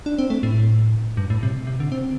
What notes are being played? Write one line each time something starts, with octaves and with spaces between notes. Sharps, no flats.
D4
C4
A3
A2
G2
A2
C3
C3
D3
C4